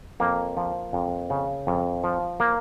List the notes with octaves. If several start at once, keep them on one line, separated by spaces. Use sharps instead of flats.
F2 A#3
F3
F2
C#3
F2
F3
A#3